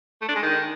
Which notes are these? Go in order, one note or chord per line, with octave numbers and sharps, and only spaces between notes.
A3
D4
G#3
D#3